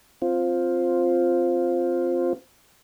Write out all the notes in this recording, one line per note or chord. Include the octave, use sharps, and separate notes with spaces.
C4 F4